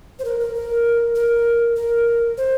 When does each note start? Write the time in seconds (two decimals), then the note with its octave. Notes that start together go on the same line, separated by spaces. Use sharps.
0.19 C5
0.25 A#4
0.40 A#4
0.55 A#4
1.15 A#4
1.76 A#4
2.38 C5